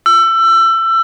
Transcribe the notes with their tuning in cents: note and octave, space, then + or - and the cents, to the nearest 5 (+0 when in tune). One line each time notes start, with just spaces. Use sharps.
E6 +25